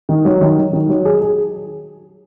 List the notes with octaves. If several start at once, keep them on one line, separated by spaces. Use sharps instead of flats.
D#3
F#3
D#3
F#3
D#3
F#3
G#4
G#4